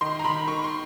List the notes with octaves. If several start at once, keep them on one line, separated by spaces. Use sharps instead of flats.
D#3 C6
A#5
D#3 B5
D#3 C#6
C6